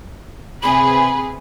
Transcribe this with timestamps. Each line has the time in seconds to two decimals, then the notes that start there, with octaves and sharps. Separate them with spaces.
0.63 C3 G#4 B4 B5